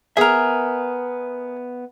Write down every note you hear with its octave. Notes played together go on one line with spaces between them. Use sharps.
B3 G#4 A#4 E5